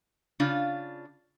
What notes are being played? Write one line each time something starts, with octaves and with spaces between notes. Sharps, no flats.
C#3 D4 F4